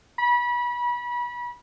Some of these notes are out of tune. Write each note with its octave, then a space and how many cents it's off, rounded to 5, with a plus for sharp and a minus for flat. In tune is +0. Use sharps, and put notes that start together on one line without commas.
B5 -30